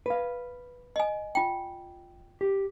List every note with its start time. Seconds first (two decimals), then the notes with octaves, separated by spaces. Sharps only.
0.06 B4 F5
0.96 D#5 G#5
1.35 F4 G5
2.41 G4